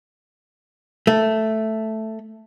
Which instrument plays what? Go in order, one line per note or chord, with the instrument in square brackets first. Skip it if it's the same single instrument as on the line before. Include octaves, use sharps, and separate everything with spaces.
[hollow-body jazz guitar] A3